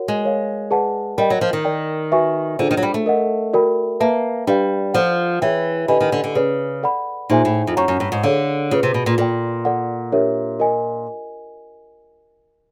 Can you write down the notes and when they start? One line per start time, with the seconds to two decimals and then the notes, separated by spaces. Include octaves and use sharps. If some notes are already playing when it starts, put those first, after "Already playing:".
Already playing: F#4 A#4 C#5 F#5
0.08 G#3
0.24 A#4 C#5 F5
0.71 G#4 B4 D5 F#5 A5
1.18 G3 A#4 D#5 G5
1.30 F#3
1.41 F3
1.53 D#3
1.65 A#4 D5 G5
2.12 F#4 B4 E5 G#5 C#6
2.59 D3 D4 F4 G#4 C5
2.71 D#3
2.77 F#3
2.83 G3
2.94 A3
3.06 A#4 D#5 F#5
3.53 F#4 A#4 D5 G5 B5
4.00 A#3 B4 E5 A5
4.47 G3 D4 G4 B4 D5 F5
4.94 F3 A4 D5 F#5
5.42 E3 G#4 C#5 E5 G5
5.88 D3 G4 B4 D#5 G#5 B5
6.01 D#3
6.12 D3
6.24 D3
6.35 C#3 G#4 B4 D5
6.83 A4 D5 F#5 B5
7.30 A#2 D#4 G#4 C5 E5 G#5
7.45 A2
7.67 F2
7.77 F#2 C#5 F#5 A#5 C#6
7.88 F#2
8.00 G2
8.12 G#2
8.23 D3 G#4 C#5 F5
8.71 C#3 F4 G#4 B4
8.83 C3
8.94 B2
9.06 A#2
9.18 A#2 F4 A4 D5 G5
9.65 A4 D5 F#5
10.12 D4 G4 A#4 C#5 E5
10.59 F4 A#4 D#5 G#5